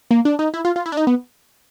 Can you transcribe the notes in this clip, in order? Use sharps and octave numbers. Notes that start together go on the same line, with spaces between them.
A#3
D4
D#4
E4
F4
F4
E4
D4
D#4
B3